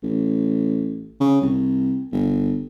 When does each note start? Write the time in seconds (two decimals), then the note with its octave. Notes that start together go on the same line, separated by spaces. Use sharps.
0.03 A1
1.20 C#3
1.42 C2
2.12 G1